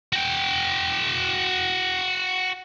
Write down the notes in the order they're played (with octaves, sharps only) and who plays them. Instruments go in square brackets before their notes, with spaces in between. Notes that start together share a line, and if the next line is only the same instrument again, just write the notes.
[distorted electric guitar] F#4 G5